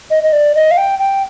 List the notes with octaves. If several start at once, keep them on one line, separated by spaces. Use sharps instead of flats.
D#5
D#5
D5
D#5
F5
G5
G5